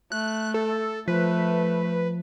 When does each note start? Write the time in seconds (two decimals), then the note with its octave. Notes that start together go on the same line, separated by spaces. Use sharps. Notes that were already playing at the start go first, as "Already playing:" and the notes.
0.12 A3 F#6
0.54 A4
1.08 F3 A3 B4